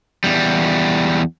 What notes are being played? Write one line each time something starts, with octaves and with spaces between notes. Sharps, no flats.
E2 G3